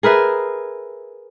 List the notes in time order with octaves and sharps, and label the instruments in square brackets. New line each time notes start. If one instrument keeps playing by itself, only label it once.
[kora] G#4 A#4 B4 E5